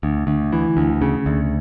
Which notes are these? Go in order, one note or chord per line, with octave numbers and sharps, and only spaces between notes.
D2
D2
E3
D2
C#3
D2